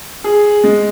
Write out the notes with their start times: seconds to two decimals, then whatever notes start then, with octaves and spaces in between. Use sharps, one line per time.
0.24 G#4
0.64 G#3